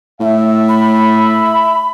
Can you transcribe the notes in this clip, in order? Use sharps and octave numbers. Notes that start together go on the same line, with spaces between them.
A2 E5
B5